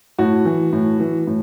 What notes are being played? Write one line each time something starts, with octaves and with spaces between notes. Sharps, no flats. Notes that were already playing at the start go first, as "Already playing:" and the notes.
A2 F#4
E3
A2
E3
A2